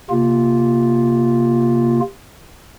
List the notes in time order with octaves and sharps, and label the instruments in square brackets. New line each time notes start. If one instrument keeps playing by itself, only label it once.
[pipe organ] C3 A#3 F4